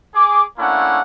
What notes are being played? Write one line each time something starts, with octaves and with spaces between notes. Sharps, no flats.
G#4 D6
A3 A#3 C#4 D4 E4 F#5